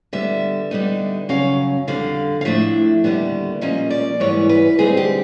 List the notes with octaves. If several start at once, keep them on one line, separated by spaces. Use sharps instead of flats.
D3 G3 B3 E5
D3 G3 B3 D#4
F#2 C#3 F#3 C#4 F5
F2 D3 G3 F5
F5
A2 F3 A3 D4 E5
D#2 D3 G3 B3
A#2 F3 A#3 C#4 D#5
D5
G#2 E3 G3 B3 C#5
B4
F2 D3 G3 C4 D#4 G#4
G4